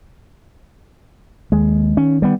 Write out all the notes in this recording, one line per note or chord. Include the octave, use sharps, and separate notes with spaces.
D#2 G#3
D#3 C#4
G3 B3